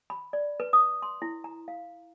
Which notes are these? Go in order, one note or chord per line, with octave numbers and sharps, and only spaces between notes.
B5
D5
B4
D#6
C6
E4
A#5
F5